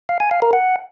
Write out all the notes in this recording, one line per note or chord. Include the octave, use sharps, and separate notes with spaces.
F5
G#5
F5
A#4
F#5